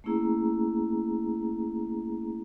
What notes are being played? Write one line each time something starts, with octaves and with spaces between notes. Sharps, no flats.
A3 A#3 C#4 E4 G#4 A#5